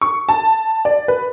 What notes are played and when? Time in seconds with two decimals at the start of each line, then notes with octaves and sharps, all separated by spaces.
0.01 C#6
0.29 A5
0.85 D5
1.08 B4